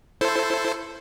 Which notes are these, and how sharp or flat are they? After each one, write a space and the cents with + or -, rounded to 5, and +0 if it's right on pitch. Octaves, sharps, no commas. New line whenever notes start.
E4 +20 A4 +0 C5 +0